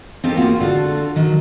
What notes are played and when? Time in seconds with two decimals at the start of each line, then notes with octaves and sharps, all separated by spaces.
0.24 C4 D#4 F4 G4 A4 A#4
0.37 A#3 F4 F#4 G#4 F5
0.60 D3 F4 F#4 A4
1.16 D#3 F#3